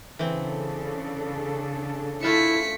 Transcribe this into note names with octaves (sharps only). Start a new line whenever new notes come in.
C#3 E3 C4 D4 A4
A3 E4 F4 E5 B6 C#7